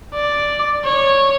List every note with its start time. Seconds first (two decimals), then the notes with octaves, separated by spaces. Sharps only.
0.14 D5
0.84 C#5